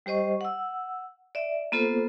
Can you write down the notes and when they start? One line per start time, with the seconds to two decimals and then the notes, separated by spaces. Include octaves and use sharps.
0.06 G3 G4 C5 D#5 C#6
0.41 F#5 E6
1.35 D5 E5
1.72 A#3 B3 F4 A4 C5